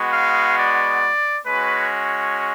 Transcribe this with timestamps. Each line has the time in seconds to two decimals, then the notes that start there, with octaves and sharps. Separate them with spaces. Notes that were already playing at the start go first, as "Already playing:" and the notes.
Already playing: G#3 B3 F#4
0.12 F5
0.57 D5
1.46 G#3 C#4 F#4 B4